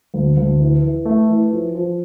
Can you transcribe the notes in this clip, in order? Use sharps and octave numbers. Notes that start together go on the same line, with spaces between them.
D2
D2
E3
E3
A3
E3
F3
F3